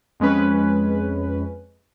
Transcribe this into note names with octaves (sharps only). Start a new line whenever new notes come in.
F2 G#3 C#4 B4